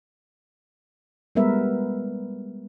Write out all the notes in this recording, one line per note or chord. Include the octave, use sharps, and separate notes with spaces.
G3 G#3 B3 A#4 B4 E5